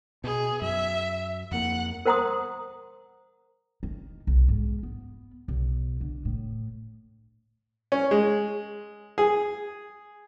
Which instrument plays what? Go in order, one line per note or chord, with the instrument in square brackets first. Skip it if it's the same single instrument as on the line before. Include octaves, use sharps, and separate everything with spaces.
[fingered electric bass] B2 [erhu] G#4
[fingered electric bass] F#2 [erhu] E5
[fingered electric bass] F2 A#3 [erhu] F#5
[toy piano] A#4 C5 F#5 A#5 C6 D#6
[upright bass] D#3
B1
G#2
B3
B1
D3
A2
[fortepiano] C#4
G#3
G#4